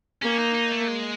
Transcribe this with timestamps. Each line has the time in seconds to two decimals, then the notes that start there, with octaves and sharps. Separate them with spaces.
0.22 A#3 C#4
0.39 D#4
0.54 D#4
0.72 A3
0.88 G#3